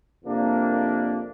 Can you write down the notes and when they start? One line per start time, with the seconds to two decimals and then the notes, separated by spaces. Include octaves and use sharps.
0.24 F2 C3 A#3 D4